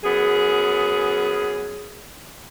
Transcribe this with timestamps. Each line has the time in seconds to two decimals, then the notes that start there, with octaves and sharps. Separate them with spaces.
0.04 F#2 B3 G#4